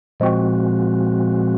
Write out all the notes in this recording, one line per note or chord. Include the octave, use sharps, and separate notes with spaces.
A#2 F3 G#3 C4 F#4